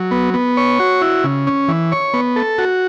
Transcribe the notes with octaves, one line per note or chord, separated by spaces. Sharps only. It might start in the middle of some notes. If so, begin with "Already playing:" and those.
Already playing: F#3
B3
B3
C#5
F#4
E4
C#3
C#4
E3
C#5
B3
A4
F#4